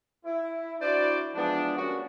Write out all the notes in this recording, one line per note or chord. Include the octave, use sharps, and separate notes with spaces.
E4
D4 E4 F#4 C5 D5
E3 F3 G#3 B3 D4
G3 A#3 C#4 F#4